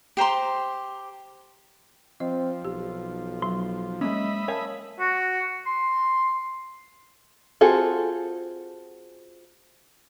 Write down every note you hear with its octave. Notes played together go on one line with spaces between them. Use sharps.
G4 C5 A#5 C6
F3 C4 D#5
B1 G4
F#3 C6
G#3 A#3 C#4 D#5 E5 B5
A#4 C#5 F5 G#5 A5
F#4
C6
C4 F4 F#4 G#4 A4